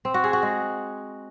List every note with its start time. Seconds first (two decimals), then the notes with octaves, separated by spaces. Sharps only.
0.05 C4
0.14 F#4
0.24 G#4
0.33 F#4
0.43 G#3